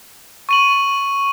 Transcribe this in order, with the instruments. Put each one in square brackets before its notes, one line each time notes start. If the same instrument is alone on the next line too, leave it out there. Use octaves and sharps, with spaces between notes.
[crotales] C#6 D#7 F#7